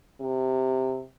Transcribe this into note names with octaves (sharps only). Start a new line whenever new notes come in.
C3